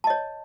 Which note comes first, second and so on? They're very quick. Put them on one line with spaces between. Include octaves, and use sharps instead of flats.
A5 D#5 C#5